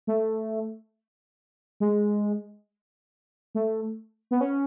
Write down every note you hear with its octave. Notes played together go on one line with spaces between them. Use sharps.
A3
G#3
A3
B3
C#4